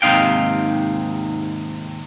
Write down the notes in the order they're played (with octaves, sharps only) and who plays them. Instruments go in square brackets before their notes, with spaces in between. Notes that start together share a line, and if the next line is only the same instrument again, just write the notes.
[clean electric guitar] D#2 G#2 C3 D#4 F5 G5